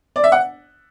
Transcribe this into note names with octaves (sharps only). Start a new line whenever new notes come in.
D5
E5
F#5